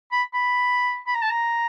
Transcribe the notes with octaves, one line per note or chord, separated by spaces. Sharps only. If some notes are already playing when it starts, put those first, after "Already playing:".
B5
B5
B5
A#5
A5
A#5